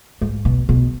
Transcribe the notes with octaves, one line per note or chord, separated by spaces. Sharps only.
G#2
B2
B2